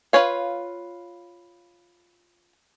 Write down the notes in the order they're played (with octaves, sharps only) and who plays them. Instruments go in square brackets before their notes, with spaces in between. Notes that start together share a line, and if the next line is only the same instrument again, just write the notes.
[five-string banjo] F4 B4 C#5 F5